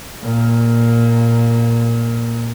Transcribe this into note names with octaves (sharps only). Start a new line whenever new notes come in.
A#2 A#3